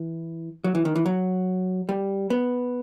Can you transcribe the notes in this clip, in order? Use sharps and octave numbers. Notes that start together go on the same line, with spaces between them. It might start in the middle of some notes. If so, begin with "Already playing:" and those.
Already playing: E3
F#3
E3
D#3
E3
F#3
G3
B3